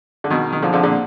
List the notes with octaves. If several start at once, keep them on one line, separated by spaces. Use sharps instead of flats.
D3
B2 D#3
D#3
D3 F3
D3 F3
A#2 D3